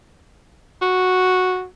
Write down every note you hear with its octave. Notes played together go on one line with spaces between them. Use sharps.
F#4